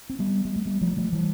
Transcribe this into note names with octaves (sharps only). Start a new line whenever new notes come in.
C4
G3 B3
G3
A3
G3 B3
F3 A3
F3 A3
E3 G3